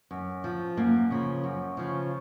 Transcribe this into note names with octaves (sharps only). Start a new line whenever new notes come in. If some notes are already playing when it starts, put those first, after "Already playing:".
F#2
F3
F#2 A#3
C#3 F3
F#2
C#3 F3